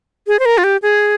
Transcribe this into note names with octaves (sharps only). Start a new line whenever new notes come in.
G#4
C5
A#4
F4
G4
G#4